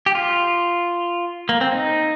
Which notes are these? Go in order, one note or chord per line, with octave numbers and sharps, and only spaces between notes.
G4
F4
A#3
C4
D#4